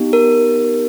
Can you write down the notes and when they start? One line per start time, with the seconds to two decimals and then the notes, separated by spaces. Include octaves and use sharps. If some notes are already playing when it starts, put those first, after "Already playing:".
Already playing: B3 D#4 G4
0.13 A#4